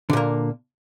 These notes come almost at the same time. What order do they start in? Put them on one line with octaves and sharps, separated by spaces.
D3 A#2 A#3